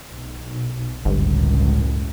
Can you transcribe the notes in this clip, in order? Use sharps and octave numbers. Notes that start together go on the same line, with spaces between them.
B1
G1 C#2 F#2 A2